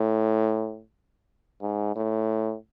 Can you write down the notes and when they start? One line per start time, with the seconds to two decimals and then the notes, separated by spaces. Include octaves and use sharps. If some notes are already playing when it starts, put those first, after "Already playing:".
Already playing: A2
1.62 G#2
1.96 A2